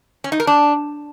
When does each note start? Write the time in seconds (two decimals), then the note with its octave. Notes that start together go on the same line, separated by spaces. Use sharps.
0.24 C#4
0.32 D#4
0.40 A#4
0.47 D4